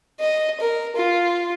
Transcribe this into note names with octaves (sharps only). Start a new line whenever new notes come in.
D#5
A#4
F4